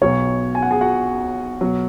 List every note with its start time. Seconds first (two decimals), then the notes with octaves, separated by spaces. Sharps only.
0.01 B1 B2 F#3 C#5 C#6
0.55 G#5
0.62 F#5
0.71 G#4 G#5
0.81 F#4 F#5
1.61 B2 F#3